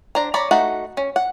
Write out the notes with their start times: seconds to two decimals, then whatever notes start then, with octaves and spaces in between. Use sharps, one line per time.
0.15 D4 C5 A#5
0.34 C#5 D5 A#5 B5
0.51 A3 D#4 F#4 F#5
0.97 C#4
1.16 F#5